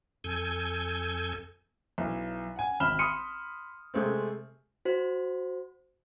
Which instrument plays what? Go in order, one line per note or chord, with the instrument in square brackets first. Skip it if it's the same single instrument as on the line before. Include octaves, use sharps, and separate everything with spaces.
[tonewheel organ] F2 A4 G#5 G6 G#6
[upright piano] B1 E4
F#5 G#5
G#1 E5 B5 F6 E7 G7
B5 C6 D#6 C#7 D#7
C3 G#3 A3 C4
[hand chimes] F#4 C5